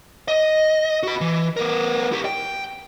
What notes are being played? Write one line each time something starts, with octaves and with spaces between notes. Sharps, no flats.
D#5
F#4 B5
E3
B3 A#4
E4 G4
G5